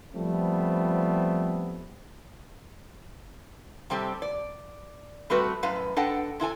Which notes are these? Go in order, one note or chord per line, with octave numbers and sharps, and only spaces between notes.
F3 G3 A3 B3 C4
C3 G3 C4 G4 A4
D5
G3 A3 C4 F#4 B4
F#2 A2 B4 F5
D4 A4 B4 D#5 F#5 G5
C3 E4 A4 G#5